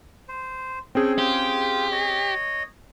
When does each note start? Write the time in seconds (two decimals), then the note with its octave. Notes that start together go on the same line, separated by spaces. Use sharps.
0.28 C5
0.95 C4 C#4 G#4 A4 G5
1.18 F4 G4 G5
1.92 C#5 D#5